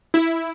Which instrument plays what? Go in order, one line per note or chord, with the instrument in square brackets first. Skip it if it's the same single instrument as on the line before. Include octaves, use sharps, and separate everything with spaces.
[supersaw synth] E4